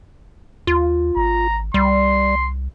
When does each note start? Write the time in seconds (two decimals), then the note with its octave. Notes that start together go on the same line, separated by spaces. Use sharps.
0.67 D#2 F4
1.17 G#1 A#5
1.74 C2 G3 C6